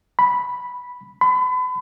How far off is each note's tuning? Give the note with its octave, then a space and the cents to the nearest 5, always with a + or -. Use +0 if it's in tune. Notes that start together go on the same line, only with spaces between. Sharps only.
B5 -5
B5 +35